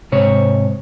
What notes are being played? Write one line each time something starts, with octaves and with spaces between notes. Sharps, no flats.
G#2 C3 C#5